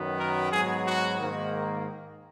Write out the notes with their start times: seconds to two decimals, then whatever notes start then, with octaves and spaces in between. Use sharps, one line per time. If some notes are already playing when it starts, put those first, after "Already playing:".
Already playing: F#2 D#3 F#3 B3
0.18 A#4
0.51 G#2 F#3 B3 G#4
0.85 F#4
1.19 G#2 D#3 A#3